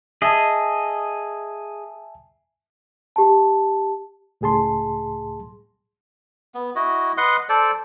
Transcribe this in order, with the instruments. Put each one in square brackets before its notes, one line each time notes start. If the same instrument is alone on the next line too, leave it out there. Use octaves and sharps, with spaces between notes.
[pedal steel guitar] G#4 D#5 [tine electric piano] E5 G#5 A5
[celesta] G4 A5
[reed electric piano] C#2 A2 G#4 A5 C6
[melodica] B3
E4 F#4 D#5
B4 D#5 F#5 C6
A4 C5 D5